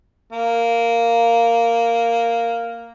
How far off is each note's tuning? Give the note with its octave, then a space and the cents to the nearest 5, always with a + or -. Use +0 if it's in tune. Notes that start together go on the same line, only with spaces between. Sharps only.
A#3 -5